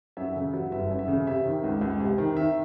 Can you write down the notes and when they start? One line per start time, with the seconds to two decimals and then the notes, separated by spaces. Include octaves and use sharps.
0.17 F#2 E5
0.36 C#3
0.54 F#3
0.72 G1 E5
0.91 F#2
0.99 E5
1.08 C#3
1.27 C3 E5
1.46 D#3
1.64 C#2
1.81 C#2
2.00 C3
2.18 D#3
2.36 D#3 E5